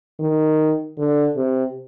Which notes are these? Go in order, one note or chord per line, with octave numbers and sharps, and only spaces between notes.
D#3
D3
C3